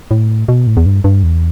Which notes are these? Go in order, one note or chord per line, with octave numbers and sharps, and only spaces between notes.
A2
B2
A2
E2
G2
G2
E2